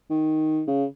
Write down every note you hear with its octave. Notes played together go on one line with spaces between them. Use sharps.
D#3
C#3